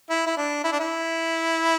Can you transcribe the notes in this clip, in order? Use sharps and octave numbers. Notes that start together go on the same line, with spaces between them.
E4
E4
D4
E4
D4
E4